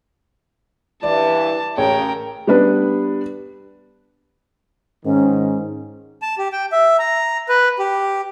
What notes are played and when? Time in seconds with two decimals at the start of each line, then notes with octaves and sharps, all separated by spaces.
1.03 G2 E3 D5 A5
1.78 A1 C#3 G#4 A#4 C#5 G5
2.47 G3 B3 D4 B4
5.05 G#2 D#3 C#4
6.22 A5
6.38 G4
6.52 G5
6.72 E5
6.99 A#5
7.49 B4
7.79 G4